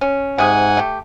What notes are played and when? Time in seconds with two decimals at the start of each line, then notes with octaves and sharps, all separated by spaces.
0.01 C#4
0.38 G#2 C3 G#4 F#5 G#5
0.77 A3 G4